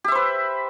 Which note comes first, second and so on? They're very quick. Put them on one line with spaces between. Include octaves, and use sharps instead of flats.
G4 E5 C5 B4